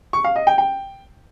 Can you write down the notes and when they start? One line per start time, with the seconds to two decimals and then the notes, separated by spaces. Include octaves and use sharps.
0.13 C#6
0.24 F5
0.36 D#5
0.47 G5
0.58 G5